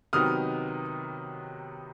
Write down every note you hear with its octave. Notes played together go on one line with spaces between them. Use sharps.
C3 D#3 F#3 B3 D#4 D#6 F6